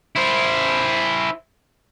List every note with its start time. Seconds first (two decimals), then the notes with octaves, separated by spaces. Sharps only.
0.16 E4 C5